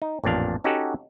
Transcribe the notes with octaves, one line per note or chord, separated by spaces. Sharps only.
D#4
A1 F2 A#2 D4 F5
C#4 D#4 F#4 G4 A4 F#5